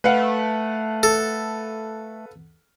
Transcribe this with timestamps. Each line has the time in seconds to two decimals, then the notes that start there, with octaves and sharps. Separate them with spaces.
0.04 A3 B4 F5 F#5
1.03 A4